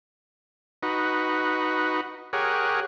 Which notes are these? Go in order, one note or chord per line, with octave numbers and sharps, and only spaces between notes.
D#4 F#4 B4
G4 G#4 A#4 C#5 F#5